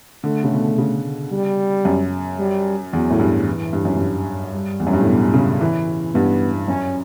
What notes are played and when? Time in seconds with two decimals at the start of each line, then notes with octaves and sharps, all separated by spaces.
0.24 D3 A3
0.44 C#3
0.51 B2
0.78 C#3
1.32 G3
1.85 F#2
2.39 G3
2.93 E2 F#3
3.11 A2
3.20 G2
3.46 E3
3.73 G2
3.85 F#2
3.97 G2
4.53 G3
4.80 E2
4.87 F#2
4.93 G2
5.00 A2
5.07 B2
5.34 C#3
5.61 E3
6.14 G2 B3
6.68 F#2 C#4